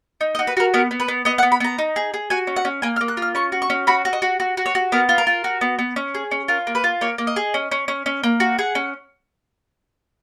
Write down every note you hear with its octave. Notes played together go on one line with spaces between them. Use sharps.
D#4
D#5
F#4
B4
F#4 A#4
B3 A#4
B3
B4
B3
B3 D#5
F#5
B3
B5
B3 A#5
D#4
G#4
G#4
F#4 G#5
C#4
F#5
C#4
A#3 G#5
F6
A#3
F#6
F4
F6
C#4 C#6
F#4
C#6
C#4
F#4 B5
F#4
D#5
F#4
F#4
F#4
C#5
F#4
B3 A#4
F4
A#4
F4
F#4
B3
B3
C#4
G#4
C#4
F4 A#4
A#3
B4
F4
A#3 C#5
A#3
D#5
G#4
C#4
C#4
C#4
C#4
A#3
F#4
G#4 F#5
C#4